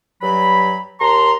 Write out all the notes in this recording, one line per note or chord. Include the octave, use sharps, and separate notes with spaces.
G2 F#3 B5
D#2 A5 A#5 C6